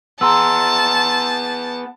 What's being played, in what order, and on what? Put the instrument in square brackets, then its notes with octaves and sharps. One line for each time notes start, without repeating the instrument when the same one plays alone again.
[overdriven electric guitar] B3 G#4 [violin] A5 [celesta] A#5 C6 E6